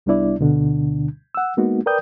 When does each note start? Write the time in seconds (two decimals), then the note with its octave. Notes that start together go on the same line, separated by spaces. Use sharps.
0.06 C2 G3 B3 D4 E4 D5
0.39 D2 B2 D3 D4
1.35 F#5 E6
1.57 G#3 A#3 B3 D#4 F#4
1.86 A#4 B4 D5 G5 D#6 G6